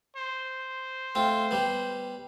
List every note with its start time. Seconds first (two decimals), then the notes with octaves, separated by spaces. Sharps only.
0.17 C5
1.15 A3 C4 F4
1.51 G3 B3